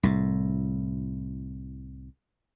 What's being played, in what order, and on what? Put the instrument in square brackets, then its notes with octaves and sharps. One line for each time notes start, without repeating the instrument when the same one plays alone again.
[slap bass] C2 A2